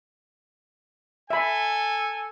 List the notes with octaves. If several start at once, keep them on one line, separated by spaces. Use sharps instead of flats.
A4 E5 G#5 B5